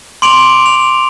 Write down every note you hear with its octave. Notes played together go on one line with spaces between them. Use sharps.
C6 D6 D7 F7 F#7
F7